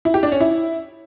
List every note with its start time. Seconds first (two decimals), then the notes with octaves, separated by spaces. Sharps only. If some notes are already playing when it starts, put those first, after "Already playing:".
0.05 E4
0.14 G4
0.23 D4
0.32 C#4
0.40 E4